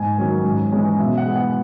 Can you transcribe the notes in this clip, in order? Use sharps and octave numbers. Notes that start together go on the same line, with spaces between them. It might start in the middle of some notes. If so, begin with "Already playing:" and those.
Already playing: G#2 G#5
D#3 F#3 C#4
G#2
E3 G#3 C#4
B2 E5
F#5
G#3 B3
F#5